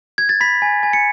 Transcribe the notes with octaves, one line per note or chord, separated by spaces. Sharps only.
G#6
A6
B5 B6
G#5
G#5
C#7